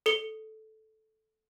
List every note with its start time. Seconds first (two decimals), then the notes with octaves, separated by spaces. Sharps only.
0.06 A4 C#7 G7